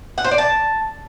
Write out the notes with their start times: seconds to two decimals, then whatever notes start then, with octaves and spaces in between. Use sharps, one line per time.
0.18 F#5
0.25 C5
0.31 D5
0.38 A5